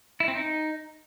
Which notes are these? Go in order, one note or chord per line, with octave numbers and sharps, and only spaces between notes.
E4
C4
D#4